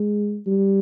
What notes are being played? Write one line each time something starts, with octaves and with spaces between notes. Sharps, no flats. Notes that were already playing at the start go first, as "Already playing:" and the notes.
Already playing: G#3
G3